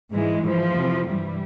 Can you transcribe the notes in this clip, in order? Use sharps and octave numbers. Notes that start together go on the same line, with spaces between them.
G#2 E3 G#3
G#2 E3 F3
F2 C3 E3
G2 E3 G3